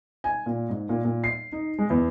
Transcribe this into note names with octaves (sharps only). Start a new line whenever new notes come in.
G#5
A#2
G#2
A#2
A#2
C7
D#4
G#3
E2